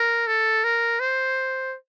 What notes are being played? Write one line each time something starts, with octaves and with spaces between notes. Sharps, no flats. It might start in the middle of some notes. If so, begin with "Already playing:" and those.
Already playing: A#4
A4
A#4
C5